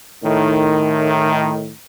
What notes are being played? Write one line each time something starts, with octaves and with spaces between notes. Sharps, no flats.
A2 D#3